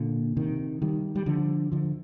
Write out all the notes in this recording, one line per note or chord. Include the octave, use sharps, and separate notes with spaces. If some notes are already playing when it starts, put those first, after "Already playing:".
Already playing: A#2 D3
C3 D#3
D#3 G3
G3
D3 F3
D3 F3